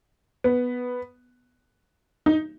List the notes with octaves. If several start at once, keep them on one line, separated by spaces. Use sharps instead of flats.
B3
D#4